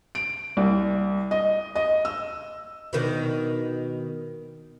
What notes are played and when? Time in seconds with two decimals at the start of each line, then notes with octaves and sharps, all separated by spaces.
0.15 D7
0.57 C2
1.31 D#5
1.75 D#5
2.05 E6
2.93 B2 D#3 D4